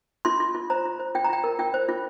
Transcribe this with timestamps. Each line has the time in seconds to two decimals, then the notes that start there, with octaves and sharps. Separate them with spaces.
0.25 F4 C6
0.40 F4
0.55 F4
0.70 C5 A#5
0.85 F4
1.00 C5
1.15 F4 G5
1.24 A#5
1.30 F4 G5
1.44 A#4
1.59 F4 G5
1.74 C5
1.89 F4